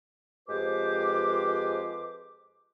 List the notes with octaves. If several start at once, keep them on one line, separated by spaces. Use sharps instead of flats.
F2 G#3 G4 B4 C5 D6